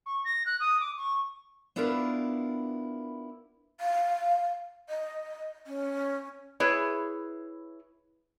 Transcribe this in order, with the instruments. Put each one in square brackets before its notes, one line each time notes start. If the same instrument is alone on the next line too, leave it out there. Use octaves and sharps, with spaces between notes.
[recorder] C#6
A#6
F#6
D#6
D6
C#6
[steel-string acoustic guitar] B3 D4 E4 F4 A#4 B4
[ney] F5
D#5
C#4
[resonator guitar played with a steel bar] E4 G#4 B4 C#5